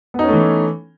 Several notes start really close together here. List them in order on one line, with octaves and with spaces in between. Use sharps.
B3 D#4 C#4 A3 E3